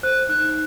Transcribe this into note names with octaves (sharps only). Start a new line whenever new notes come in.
C5 F#6
D#4 F#6